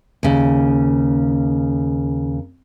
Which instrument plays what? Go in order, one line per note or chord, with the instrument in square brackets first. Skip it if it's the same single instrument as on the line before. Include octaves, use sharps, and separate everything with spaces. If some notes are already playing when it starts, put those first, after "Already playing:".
[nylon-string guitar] D#2 C#3